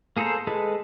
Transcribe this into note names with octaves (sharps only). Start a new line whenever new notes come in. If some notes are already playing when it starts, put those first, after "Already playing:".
A#3 G#4 A4 C5 A#5
G#3 G#4 A4 B4